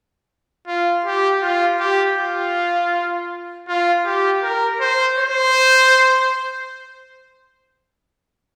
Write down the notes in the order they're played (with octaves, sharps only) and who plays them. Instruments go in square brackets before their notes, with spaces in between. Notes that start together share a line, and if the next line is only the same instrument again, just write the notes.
[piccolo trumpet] F4
G4
F4
G4
F4
F4
G4
A#4
C5
C5